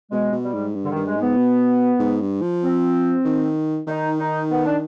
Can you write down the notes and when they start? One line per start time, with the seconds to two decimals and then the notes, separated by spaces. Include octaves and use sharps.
0.12 B2 G#3
0.32 B2
0.43 G3
0.54 G#2
0.75 G2
0.85 D3
0.90 D#3
0.96 G2
1.06 G#3
1.16 G#2 B3
1.37 B2
1.99 G#2
2.21 G2
2.42 F3
2.63 C4
3.25 D#3
3.87 D#3 D#4
4.19 D#4
4.50 B3
4.65 D4